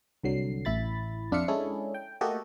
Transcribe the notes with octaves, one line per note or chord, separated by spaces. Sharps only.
C2 D3 F#3 C7
A1 E4 B5 A6
F2 D4 F4 E5 F5 C#7
G#3 C#4 D4 E4 G#4 A4
G5
A3 A#3 F#4 G4 A4 D#5